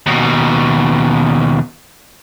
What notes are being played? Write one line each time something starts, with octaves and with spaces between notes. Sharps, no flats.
D#2 B2